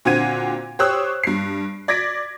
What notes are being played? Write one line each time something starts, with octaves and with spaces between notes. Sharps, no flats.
A#2 D3 C4 F#4 G#6 D#7
G4 C5 C#5 D#6 E6 F#6
G2 C7
D5 G#6 A#6 B6 D7